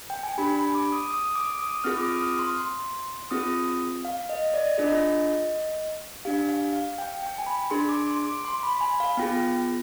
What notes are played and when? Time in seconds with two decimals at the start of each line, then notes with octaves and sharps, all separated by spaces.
0.10 G5
0.23 G#5
0.38 D4 G4 B5
0.56 B5
0.75 D6
0.92 D#6
1.10 D#6
1.35 D6
1.59 D#6
1.84 C4 F4 G#4 F6
1.97 D6
2.03 D#6
2.12 F6
2.21 D#6
2.39 C6
2.58 C6
3.31 C4 F4 G#4 D#6
4.05 F5
4.29 D#5
4.54 D5
4.78 D4 F4 G#4 D#5
6.25 D4 G4 F5
6.49 F5
6.73 F5
6.98 G5
7.23 G5
7.38 G#5
7.46 B5
7.71 D4 G#4 C6
7.89 D6
8.07 C6
8.26 D6
8.45 C6
8.63 B5
8.77 B5
8.81 G#5
9.00 F5
9.17 B3 F4 G#4 G5